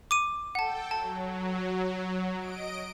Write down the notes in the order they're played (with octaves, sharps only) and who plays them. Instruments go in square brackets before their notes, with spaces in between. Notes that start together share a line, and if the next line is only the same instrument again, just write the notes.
[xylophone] D6 D#7
[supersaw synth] A4 G5 [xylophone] F#5 A5
[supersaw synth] F#3 [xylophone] A5
[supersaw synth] D#5 D7